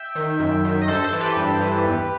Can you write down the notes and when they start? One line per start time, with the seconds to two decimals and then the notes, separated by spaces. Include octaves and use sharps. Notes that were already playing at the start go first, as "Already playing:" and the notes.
Already playing: E5 G5
0.15 D#3
0.39 F#2
0.64 D#3
0.82 D#5
0.88 G2 A4 C5
1.04 A4 C5
1.13 E3
1.20 G4 B4
1.36 G2
1.61 E3
1.85 E2